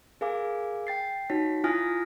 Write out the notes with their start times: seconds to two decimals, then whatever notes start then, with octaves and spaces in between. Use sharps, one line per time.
0.21 G#4 A#4 F5 G#5 D6
0.87 G5 A6 C7
1.30 D#4 F#4 C#5 B6
1.64 E4 F4 G#5 D#6 F6 A#6